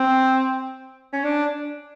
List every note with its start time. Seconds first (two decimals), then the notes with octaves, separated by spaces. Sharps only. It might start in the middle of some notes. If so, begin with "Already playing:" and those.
Already playing: C4
1.13 C#4
1.24 D4